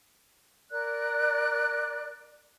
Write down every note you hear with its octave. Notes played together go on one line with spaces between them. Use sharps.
A#4 D5 F#6